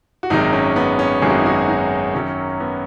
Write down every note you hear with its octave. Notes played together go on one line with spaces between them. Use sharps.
F#4
G#1 F#2 D#3 G#3 D#4
C#4
B3
C#4
G#1 F#2 D#3 G#3 G#4
F#4
D#4
F#4
D#4
F#2 D#3 F#3 C#4
B3